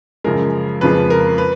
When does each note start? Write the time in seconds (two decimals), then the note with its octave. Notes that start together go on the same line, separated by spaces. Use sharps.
0.24 F#2 C#3 F3 G#3 A#4
0.81 F2 C#3 F3 G#3 B4
1.10 A#4
1.38 B4